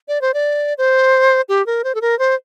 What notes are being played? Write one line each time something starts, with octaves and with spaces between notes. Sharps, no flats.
D5
C5
D5
C5
G4
A#4
C5
A4
A#4
C5